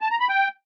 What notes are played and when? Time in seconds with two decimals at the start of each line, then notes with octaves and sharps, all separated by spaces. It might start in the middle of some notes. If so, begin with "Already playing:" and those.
0.01 A5
0.10 A#5
0.20 B5
0.29 G5